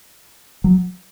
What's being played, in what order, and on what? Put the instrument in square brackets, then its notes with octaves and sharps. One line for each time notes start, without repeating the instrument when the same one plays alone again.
[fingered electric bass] F#3